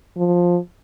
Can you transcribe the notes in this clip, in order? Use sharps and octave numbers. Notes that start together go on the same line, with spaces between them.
F3